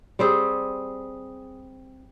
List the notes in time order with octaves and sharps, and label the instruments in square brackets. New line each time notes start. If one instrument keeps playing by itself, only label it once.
[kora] G3 C4 G#4